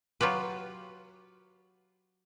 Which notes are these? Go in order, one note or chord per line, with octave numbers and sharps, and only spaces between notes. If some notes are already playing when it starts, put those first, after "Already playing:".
F#3 F4 G4 B4